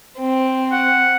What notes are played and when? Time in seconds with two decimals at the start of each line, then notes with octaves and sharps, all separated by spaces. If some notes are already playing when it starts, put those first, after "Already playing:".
0.19 C4
0.72 F#5